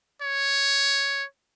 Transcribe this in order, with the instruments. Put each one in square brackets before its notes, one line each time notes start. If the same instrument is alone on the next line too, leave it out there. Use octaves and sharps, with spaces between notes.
[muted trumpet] C#5